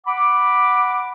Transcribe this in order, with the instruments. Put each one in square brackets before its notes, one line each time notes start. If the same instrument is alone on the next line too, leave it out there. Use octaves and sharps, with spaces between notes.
[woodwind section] F#5 B5 D6